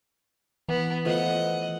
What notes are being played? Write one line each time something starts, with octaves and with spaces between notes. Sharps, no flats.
E3 B3
F3 A3 B3 D#5 F#5